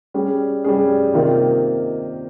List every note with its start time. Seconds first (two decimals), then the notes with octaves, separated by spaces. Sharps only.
0.14 G3 C#4 G#4
0.64 G3 C#4 G#4
1.13 C3 D#3 A#3 F4